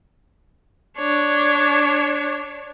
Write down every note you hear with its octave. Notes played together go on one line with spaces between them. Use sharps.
D4 C#5